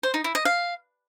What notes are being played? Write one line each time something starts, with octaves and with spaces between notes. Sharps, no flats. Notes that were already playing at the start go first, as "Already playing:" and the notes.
C5
D#4
E4
D#5
F5